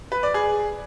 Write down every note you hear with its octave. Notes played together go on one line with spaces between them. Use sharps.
B4
D5
G#4